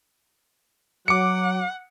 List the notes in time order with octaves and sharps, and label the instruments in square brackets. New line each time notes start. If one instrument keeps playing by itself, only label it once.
[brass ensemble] F#3 [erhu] F#5 [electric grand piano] D6 C#7